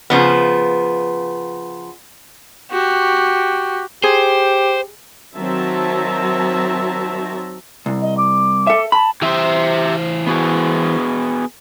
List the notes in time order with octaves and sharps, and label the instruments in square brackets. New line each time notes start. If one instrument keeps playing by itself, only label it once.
[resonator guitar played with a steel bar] C#3 F3 B3
[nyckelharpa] F#4 G4
[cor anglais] G4 [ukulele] G#4 [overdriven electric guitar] C5
[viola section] D#3 F#3 C4 E5 A5 A#5
[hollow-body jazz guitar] C2
[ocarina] D#5
D6
[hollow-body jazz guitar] A4 E5
[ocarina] A5 [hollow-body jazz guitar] B5
[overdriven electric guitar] E3 C5 [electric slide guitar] G4 E5
[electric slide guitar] B3 F#4 G#4